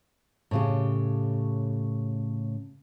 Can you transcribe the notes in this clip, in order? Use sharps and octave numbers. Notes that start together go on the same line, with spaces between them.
A2 C#3 G4